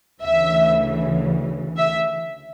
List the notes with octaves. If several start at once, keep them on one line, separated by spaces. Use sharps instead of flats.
D2 C#3 E3 E5
E5